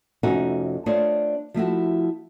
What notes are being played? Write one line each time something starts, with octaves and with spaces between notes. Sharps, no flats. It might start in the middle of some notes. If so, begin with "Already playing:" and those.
F2 C3 A3 C#4 D#4 F#4
A3 D4 F4 C5 C#5 D#5
F3 A3 E4 F#4